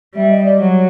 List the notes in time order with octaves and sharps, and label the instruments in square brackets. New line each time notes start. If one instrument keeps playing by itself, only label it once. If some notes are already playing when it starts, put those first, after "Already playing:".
[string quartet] G3 [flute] E5
[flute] D#5
D5
[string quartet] F#3 [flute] C#5